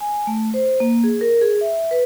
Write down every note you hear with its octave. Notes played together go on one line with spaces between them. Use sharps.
G#5
A3
C5
A#3
G#4
A#4
G#4
E5
B4